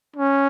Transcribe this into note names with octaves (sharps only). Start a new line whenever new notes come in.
C#4